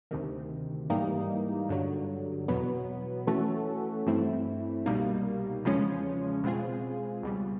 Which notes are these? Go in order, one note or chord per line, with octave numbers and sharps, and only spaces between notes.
D2 C3 D#3
G#2 E3 G3 A#3 D#4
G2 D3 F#3
E2 B2 F#3 B3
E3 A3 C#4 F#4 A4
G2 E3 A3 C4 E4
C2 B2 G3 A#3 D#4
E2 C#3 F3 G#3 C#4
B2 G#3 C4 F4 G#4
C#2 B2 G3